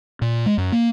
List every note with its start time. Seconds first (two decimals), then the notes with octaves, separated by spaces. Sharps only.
0.22 A#2
0.46 G#3
0.58 F#2
0.72 A#3